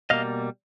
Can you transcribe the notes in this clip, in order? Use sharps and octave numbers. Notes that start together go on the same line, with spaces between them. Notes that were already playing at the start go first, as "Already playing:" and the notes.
B2 G3 A#3 D#5 F5